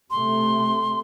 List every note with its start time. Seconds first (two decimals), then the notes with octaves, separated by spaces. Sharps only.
0.11 C3 A3 C6